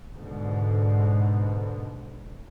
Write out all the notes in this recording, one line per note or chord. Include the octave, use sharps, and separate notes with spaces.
G#2 B2 D3